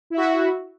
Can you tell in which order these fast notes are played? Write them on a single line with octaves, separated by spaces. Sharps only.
E4 E5 F#4